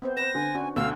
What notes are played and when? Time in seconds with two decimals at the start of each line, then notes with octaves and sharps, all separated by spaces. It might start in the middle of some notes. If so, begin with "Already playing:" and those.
0.02 B3 C4 C5
0.17 B4 C5 A#6 E7
0.35 D3 G#5
0.55 C#4 D4 F#4
0.76 D2 B2 F5 E6